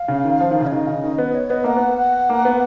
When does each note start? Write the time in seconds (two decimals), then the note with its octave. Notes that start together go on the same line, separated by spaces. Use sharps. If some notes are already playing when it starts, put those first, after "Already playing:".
Already playing: F5
0.08 C#3
0.25 D#3
0.40 F3
0.51 D#3
0.61 C#3
0.67 C#5
0.72 D#3 D#5
0.87 C#3
1.03 D#3
1.18 B3
1.35 C#5
1.50 B3 D#5
1.64 A#3 F#5
1.77 B3
1.98 F#5
2.29 A#3
2.45 B3